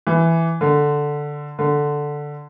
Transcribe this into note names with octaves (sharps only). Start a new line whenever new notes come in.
E3
D3
D3